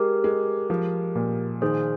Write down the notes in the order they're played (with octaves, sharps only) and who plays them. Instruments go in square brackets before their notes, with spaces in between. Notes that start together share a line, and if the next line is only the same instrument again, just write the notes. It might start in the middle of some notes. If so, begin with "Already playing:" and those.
Already playing: [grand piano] G#3 [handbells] G4 A#4
[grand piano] G#3
F3
A#2
[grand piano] D#3 [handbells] G#4 C5